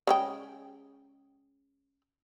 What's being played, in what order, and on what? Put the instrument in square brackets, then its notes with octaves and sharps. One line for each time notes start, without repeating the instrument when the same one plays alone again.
[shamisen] C#3 G#3 G5